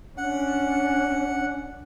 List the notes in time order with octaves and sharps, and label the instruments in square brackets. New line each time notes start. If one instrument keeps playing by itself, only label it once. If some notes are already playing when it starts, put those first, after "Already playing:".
[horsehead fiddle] C#4 D4 [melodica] F#5